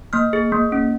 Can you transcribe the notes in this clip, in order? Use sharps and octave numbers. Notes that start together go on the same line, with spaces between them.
A#3 F6
G#4
A#3
C#4